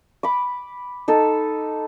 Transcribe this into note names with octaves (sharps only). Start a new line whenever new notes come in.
B5 D6
D#4 A4 A5